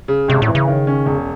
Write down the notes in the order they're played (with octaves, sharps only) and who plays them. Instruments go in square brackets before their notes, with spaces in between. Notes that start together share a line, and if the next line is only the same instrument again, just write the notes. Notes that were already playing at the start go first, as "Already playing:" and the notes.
[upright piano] C#3
[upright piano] G#1 [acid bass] C3
[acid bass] A2
[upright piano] E3
[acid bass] C#3
[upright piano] D#3
C#4
E1